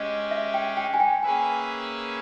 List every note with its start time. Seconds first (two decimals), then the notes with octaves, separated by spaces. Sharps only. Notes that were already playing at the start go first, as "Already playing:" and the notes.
Already playing: G#3 C#4 G4 D#5
0.31 E5
0.54 G5
0.77 G5
0.94 G#5
1.00 G5
1.23 A#3 C#4 G#4 B4 E5 G#5